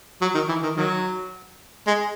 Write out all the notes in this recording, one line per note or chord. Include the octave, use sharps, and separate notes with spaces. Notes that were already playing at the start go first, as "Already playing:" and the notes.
F#3
D#3
E3
D#3
D#3 F#3
G#3